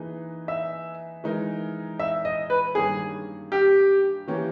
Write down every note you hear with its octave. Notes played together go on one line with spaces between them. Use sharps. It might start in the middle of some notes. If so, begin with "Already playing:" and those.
Already playing: E3 A#3 D#4 G#4 B4
E5
E3 G#3 D#4 A#4
E5
D#5
B4
G2 D#3 A#3 C#4 G#4
G4
E3 A#3 C#4 G4